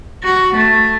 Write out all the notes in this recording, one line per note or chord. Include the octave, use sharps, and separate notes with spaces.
F#4
A3